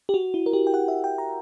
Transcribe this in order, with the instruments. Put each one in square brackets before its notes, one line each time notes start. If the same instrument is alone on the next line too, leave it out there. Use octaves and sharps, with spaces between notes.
[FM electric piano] G4
F#4
E4
A#4
G4
G5
F#5
E5
G5
A#5